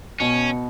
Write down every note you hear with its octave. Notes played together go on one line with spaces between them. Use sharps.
B2 C#4